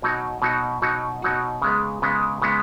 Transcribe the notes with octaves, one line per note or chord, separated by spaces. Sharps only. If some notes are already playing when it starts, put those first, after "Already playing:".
B2 F#3 D#4 F#4
B2 F#3 D#4 F#4
B2 F#3 D#4 F#4
B2 F#3 D#4 F#4
C#3 G#3 B3
C#3 G#3 B3
C#3 G#3 B3